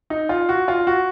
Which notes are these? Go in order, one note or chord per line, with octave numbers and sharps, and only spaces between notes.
D#4
F4
F#4
F4
F#4